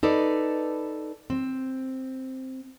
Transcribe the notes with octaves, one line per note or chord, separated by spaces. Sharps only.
D#4 A4 B4 D5
C4